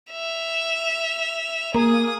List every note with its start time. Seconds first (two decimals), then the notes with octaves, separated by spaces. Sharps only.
0.11 E5 F7
1.75 A#3 G#4 D#6